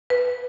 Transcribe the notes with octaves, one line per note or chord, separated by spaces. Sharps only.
B4